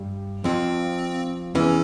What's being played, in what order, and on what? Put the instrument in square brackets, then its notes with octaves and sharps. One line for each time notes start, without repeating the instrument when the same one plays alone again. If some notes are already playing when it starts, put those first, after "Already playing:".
Already playing: [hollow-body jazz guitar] G2 G3
[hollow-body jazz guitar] F2 F3 [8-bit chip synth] C4
[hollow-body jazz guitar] E2 E3 [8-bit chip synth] C#4